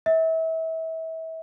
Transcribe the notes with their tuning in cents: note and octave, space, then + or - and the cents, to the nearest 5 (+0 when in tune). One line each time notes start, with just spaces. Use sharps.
E5 -30